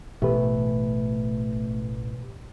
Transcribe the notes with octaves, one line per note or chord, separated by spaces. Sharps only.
A1 B2 A3 G4 B4